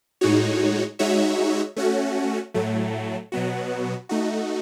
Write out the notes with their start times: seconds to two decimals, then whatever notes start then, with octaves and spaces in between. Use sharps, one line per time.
0.21 A2 G#3 D#4 F#4 C#5
0.99 G#3 D#4 F#4 C#5 E5
1.76 A3 C#4 F#4
2.54 A2 F#3 A3
3.32 B2 F#3 B3 F#4
4.09 A3 D#4 F#4